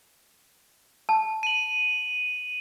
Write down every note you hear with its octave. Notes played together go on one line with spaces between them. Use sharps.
A5
D#7 F#7